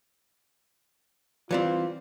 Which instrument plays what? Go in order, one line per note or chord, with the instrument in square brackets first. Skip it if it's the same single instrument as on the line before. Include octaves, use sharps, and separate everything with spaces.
[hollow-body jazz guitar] E3 G3 C4 [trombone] F4